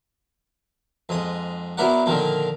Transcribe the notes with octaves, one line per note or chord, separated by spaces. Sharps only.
F2 G#2 D#6
F#3 B3 E4 A#4 D5 F#5
A#2 D3 D#3 F3 A#3